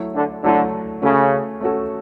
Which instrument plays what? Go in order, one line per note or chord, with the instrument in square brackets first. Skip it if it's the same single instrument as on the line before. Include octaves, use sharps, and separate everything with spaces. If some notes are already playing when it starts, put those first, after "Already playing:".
Already playing: [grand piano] F#3 A3 E4
[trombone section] D3
[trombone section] D3 [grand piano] F#3 A3 E4
[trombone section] C#3 [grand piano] A3 C#4 F#4 A4
[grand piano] A3 C#4 F#4 A4